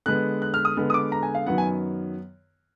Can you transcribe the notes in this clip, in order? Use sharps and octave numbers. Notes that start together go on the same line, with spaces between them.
D3 G#3 B3 F#6
F#6
F6
D#6
D3 G#3 B3
D#6
D6
A#5
G#5
F5
F#2 D#3 F#3 B3 F#5
G#5